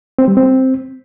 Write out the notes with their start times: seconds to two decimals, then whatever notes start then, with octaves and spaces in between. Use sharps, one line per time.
0.18 C4
0.28 G3
0.37 C4